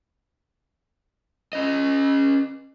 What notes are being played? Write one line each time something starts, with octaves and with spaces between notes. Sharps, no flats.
C#4 D#5